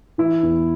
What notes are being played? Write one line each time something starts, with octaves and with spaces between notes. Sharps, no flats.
E3 E4
E2